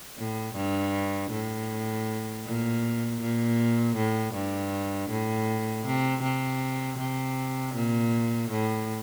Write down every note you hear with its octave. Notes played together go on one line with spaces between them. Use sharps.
A2
G2
A2
A#2
A#2
A2
G2
A2
C3
C3
C3
A#2
A2